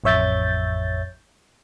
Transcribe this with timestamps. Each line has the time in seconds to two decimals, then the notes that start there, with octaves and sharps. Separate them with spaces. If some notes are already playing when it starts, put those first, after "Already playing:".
0.04 A1 F2 C#5 E5 G6 A6